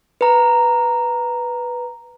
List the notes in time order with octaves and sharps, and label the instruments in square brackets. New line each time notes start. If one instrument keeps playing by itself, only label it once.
[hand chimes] B4 A#5